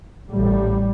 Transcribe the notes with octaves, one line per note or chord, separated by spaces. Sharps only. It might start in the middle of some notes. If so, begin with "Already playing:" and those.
A1 A2 G3